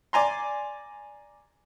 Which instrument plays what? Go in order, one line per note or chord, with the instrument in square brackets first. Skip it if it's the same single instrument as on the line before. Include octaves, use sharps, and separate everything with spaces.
[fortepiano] D5 G#5 A#5 C6